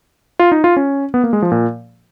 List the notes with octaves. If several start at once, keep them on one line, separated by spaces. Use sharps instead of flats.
F4
D#4
F4
C#4
B3
A#3
G#3
F3
A#2